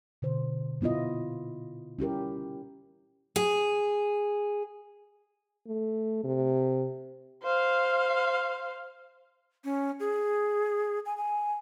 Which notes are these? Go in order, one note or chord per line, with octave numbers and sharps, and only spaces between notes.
B2 D3 C5
A#2 B3 E4 F4 D#5
C#4 E4 G4 A#4
G#4
A3
C3
C5 F5
C#4
G#4
G#5
G#5